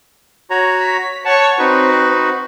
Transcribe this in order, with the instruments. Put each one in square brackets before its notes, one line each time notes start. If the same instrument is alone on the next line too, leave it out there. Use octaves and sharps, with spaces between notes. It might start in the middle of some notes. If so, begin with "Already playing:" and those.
[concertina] F#4 C#5 A#5
[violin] B6
[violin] C#5 [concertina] F#5 A5
[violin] C4 [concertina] D#4 F#4 B4